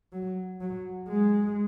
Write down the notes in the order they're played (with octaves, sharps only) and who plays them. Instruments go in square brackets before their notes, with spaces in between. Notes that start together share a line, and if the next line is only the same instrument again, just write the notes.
[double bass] F#3
F#3
G#3